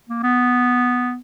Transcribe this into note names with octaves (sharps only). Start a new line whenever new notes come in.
A#3
B3